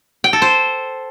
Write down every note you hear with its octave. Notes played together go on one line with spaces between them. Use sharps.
G5
A4
C5